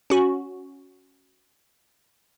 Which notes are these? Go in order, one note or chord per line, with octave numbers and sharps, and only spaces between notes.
C#4 F#4